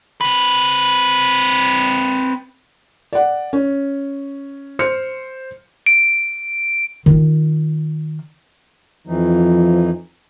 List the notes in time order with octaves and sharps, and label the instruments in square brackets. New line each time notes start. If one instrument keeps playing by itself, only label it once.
[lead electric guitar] C4 B4
[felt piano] D5 F#5
C#4
C5 F6 C#7
[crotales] D7
[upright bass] D#3 F4
[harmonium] F2 E3 D#4 [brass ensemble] F3